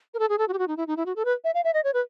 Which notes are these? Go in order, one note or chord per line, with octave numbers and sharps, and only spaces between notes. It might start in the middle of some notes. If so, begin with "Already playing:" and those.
A#4
A4
G#4
A4
F#4
G4
F#4
D#4
E4
D#4
E4
F#4
A4
B4
E5
F5
E5
D#5
C#5
B4